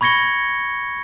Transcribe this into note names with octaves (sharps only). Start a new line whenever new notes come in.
B5 C#6 G#6 A#6 C#7 G7